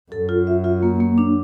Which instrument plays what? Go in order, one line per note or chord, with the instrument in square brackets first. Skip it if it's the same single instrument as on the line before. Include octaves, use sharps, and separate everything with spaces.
[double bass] F#2 [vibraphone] A4
[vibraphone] F4
E5
F4
A#3
A#3
D4